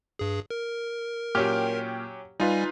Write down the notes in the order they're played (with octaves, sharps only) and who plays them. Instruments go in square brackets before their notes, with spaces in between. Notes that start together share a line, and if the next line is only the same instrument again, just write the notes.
[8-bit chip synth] G2 G#4
A#4
[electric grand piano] A#2 G5 F6 [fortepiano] F#3 C#4 G4
[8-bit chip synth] G3 G#5 [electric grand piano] D#4 F4 B4